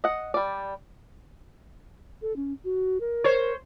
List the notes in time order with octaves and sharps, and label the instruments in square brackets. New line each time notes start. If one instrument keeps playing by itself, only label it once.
[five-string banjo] D#5 F#5
G3 D5
[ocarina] A4
C#4
F#4
A#4
[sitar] C5 C#5